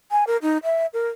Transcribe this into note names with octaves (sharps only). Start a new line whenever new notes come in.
G#5
A#4
D#4
E5
A#4